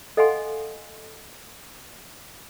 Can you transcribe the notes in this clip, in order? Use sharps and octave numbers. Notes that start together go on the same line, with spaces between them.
A4 D#5 F5 F#5 G#5 C6